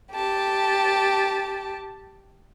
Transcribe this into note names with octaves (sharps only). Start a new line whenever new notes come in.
G4 A5